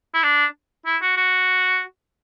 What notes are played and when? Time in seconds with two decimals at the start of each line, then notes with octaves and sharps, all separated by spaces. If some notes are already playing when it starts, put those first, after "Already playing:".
0.14 E4
0.23 D4
0.85 E4
1.02 F#4
1.17 F#4